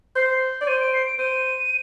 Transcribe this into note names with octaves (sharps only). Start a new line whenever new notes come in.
C5 C7
C7
D5
C5 D#7
D7
C7
D7
C5 D#7